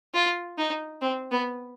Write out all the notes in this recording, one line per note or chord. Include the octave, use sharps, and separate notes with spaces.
F4
D#4
C4
B3